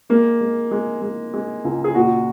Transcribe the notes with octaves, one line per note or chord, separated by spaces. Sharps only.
G#3 A#3
G#3
G#3
G#3
G#3
C#2
G#4
A#2 F#4